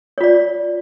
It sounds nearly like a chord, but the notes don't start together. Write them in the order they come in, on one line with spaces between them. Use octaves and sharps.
C#5 F4 D5